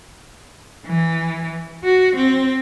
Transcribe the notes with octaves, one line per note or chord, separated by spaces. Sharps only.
E3
F#4
C4